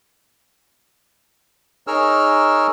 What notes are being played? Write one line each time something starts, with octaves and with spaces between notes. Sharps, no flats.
D#4 G#4 A#4 C#5 E6 F6